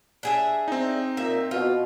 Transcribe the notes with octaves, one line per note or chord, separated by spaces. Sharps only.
D4 G#4 E5
C4 D#4
A#2 A#3 E5
B2 F4